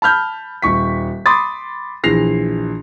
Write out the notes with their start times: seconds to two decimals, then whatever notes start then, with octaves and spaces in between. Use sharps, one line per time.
0.02 A5 B5 F6 G6
0.62 D#1 C#6 B6
1.26 B5 C6 D6 D#6 A6
2.04 A#1 E3 A#6 C7 F7